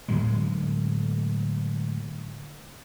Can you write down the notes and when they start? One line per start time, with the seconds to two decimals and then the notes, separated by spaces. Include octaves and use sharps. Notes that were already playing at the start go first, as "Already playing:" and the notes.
0.08 A2 D3 F#3 G#3